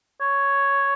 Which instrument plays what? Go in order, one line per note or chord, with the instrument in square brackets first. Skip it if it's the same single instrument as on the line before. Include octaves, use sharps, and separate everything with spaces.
[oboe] C#5